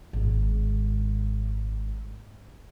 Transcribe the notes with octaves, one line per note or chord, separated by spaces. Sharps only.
G#1 G#2